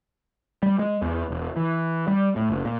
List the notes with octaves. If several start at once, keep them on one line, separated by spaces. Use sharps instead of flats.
G3
G#3
E2
E1
E3
G3
A2
F#1
A#2